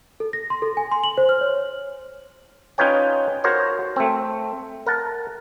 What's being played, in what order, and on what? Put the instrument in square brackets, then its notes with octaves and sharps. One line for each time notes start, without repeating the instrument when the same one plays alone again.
[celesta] A4
A#6
C6
A4
G#5
C6
F#7
C5
F6
C#5
[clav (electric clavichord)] C#4 D#4 F4 B4 C#5 G5
F#4 A#4 C5 C#5
A3 C4
A#4 F#5 A5